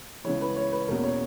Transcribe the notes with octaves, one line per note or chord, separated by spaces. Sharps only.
C#2 C#3 E3 C#5
B4
C#5
B4
E2 B2 A#3 C#4 A#4
C#5